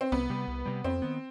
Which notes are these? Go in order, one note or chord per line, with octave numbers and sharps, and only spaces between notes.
C4
C2 B3
C3 G3
C2
C3 G3
F2 C4
D#3 B3